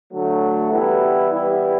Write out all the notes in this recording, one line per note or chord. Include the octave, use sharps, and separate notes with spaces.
D3 F#3 A3
E3 G3 B3 E4
E3 G3 B3 E4